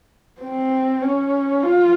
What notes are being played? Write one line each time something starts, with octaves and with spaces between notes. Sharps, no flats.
C4
C#4
F4